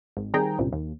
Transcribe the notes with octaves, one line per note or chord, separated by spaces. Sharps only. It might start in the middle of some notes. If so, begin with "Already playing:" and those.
G#1
D#3 G3 C4 G#4 G5 A#5
C2 G2 A#2 C#3 G3 C4
D#2